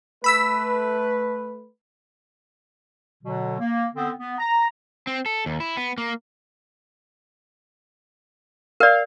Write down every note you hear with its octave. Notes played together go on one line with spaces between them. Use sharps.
A3 B4 B5 E6 B6
B2 D3 F#3
A#3
D3 B3 C4
B3
A#5
C4
A4
D#2
E4
B3
A#3
A#4 D5 F5